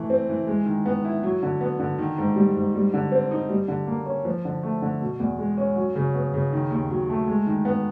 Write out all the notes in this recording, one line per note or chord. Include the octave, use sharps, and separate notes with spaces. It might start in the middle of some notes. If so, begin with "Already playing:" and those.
Already playing: E3 A3
C4
E3
G#3
D#3
B3
E4
F#3
D3
B3
D3
D#3
G#2
G3
G#2
G3
D3
C4
D#4
G3
D3
A#3
C#4
F3
D3
A3
D3
B2
E2
G#3
C#4
F#3
C#3
B3
C#3
D#3
D#2
F#3
A3
G#3
D#3
B3